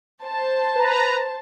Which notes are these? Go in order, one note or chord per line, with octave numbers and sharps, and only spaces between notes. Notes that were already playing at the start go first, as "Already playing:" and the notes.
C5 A5
B4 A#5